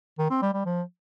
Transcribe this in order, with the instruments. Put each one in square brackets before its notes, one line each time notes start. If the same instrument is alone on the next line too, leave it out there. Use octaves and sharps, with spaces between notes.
[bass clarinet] D#3
C4
G3
G3
F3